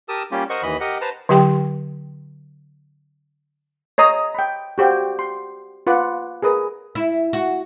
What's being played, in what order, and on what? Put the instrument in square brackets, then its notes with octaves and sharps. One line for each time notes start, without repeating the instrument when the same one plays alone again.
[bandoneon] G4 A#4 A5 D#6 E6
G3 A#3 C#4 F4 G4
A#4 C5 D#5 F#5 C#6
D#2 E3 D#5 B5
G4 A#4 D#5 F#5
B4 C5 A5 A#5
[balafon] D3 F#3 G4 G5 C6
[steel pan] C#5 D#5 A#5 D#6
G5 B5
F#4 G4 C5 F5 G5
C6
F4 B4 F#5 D6
G#4 A#4 B4 D#6
[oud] E4
F#4